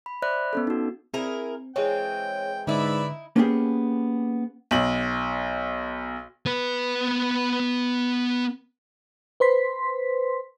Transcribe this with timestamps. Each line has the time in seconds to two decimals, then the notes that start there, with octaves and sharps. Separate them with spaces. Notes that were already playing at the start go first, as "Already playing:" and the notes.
0.06 B5
0.22 C5 D5 E5 B5 F#6
0.53 B3 C#4 A4
0.67 D#4 F#4
1.14 C4 E4 G#4 A#4
1.76 E3 G#3 C4 G#4 C#5 G5
2.67 G#2 D3 D#4 E4 B4 D5 E5
3.36 A#3 B3 C#4 D#4 G4 G#4
4.71 B1 F#7
6.46 B3 B4
9.40 B4 C5 C6 B6